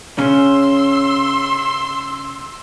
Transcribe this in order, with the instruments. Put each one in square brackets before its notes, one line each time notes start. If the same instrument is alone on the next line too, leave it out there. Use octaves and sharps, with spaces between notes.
[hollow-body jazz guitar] C#3 C#4 [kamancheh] C6 E6